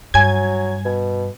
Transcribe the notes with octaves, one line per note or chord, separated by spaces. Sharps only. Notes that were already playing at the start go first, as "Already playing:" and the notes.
G2 F#3 G#5 G#6
B2